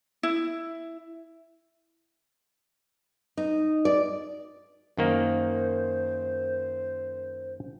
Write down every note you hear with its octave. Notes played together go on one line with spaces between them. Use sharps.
E4
D#4
D5
F#2 D#3 A#3 C5